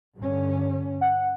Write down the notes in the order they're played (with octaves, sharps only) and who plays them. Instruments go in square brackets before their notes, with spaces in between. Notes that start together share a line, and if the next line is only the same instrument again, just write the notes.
[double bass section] G2 D3 C#4
[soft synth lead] F#5